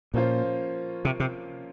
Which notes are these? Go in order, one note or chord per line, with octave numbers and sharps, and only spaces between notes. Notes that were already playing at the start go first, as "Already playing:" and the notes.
A#2 F3 A#3 C#4 F4 C5
C3
C3